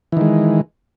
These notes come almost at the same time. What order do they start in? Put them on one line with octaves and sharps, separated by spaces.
E3 D#3 G#3